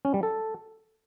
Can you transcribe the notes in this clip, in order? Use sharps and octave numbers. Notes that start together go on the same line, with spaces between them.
C#4
G3
A4